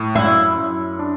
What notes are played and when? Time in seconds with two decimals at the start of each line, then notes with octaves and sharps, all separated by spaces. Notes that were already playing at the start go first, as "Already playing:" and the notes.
Already playing: A2
0.15 F#2 E4
0.57 F#2
0.99 D4